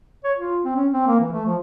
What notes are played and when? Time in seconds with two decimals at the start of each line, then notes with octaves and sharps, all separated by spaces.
0.24 C#5
0.38 F4
0.65 C4
0.76 C#4
0.93 C4
1.07 A#3
1.20 E3
1.32 A3
1.46 F3